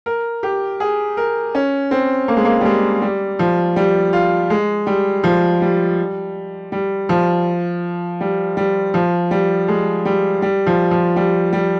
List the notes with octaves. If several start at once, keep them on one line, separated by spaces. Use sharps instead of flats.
A#4
G4
G#4
A#4
C#4
C4
A#3
G#3
A#3
G3
G#3
G3
F3
G3
F4
G#3
G3
F3
G3
G3
F3
G3
G3
F3
G3
G#3
G3
G3
F3
F3
G3
G3